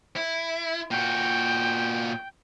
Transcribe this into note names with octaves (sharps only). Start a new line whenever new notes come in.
E4
A#2 F#4 G5